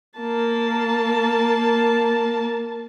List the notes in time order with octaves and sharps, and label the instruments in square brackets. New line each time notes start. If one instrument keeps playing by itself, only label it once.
[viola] A#3 A5